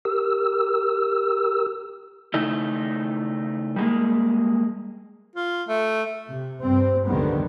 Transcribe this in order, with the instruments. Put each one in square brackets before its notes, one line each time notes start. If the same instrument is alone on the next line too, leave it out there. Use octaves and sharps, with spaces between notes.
[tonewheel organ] G4 A#4 E6
[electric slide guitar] C#3 A3 D#4 E4
G3 G#3 A#3
[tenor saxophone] F4
A3
[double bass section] C3
G2 C4
F1 C#2 D3 D#3 G3 B3